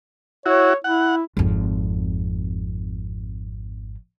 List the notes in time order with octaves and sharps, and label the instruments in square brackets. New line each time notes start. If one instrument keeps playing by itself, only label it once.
[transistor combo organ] E4 F#4 [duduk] C#5
[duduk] E4 [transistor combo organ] F#5
[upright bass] G#1 F2